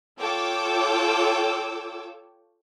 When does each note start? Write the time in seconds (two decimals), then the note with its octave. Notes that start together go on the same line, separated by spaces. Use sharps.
0.19 F4 A4 C#5 G5 D6 E6